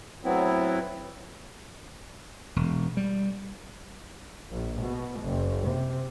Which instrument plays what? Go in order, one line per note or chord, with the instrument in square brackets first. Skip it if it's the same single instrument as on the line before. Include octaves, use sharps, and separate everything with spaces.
[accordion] A2 F#3 B3 C4 E4
[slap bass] E1
G3
[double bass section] A#1
B2
F#1
C3